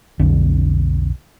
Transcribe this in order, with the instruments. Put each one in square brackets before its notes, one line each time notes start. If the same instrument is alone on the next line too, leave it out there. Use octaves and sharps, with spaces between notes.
[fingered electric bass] B1 F2 D3